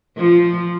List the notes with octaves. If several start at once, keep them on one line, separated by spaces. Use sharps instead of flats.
F3